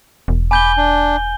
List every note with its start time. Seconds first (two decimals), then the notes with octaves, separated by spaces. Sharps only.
0.28 E1
0.51 G#5 B5 D6 G6 G7
0.77 D4